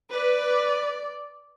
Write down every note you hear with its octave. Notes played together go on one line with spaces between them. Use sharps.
B4 D5